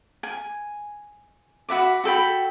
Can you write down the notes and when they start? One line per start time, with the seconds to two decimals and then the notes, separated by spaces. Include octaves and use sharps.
0.23 G#5
1.69 F#4 B4 E5 D6
2.04 F#4 A4 G5 B5